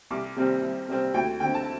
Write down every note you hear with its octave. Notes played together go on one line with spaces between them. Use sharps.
C2 D6
C3 G3 C4
C2
C3 G3 C4
D2 G5
D3 C4 G5
A5